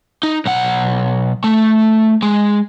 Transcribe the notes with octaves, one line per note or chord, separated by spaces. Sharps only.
D#4
B1 F#5
A3
G#3